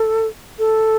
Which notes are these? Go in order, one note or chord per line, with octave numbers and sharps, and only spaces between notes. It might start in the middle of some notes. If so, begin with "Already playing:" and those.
Already playing: A4
A4